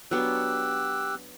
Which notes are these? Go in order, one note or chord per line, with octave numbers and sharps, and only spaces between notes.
F#3 B3 D4 G4 E6 F#6